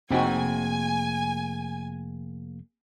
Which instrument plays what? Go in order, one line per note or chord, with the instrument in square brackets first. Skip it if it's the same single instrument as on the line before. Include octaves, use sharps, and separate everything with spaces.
[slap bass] F1 [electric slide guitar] A#3 G#4 G5 [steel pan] C4 D#4 F#4 [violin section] G#5